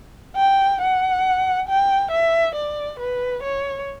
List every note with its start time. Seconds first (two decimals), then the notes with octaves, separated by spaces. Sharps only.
0.36 G5
0.81 F#5
1.68 G5
2.11 E5
2.55 D5
2.99 B4
3.43 C#5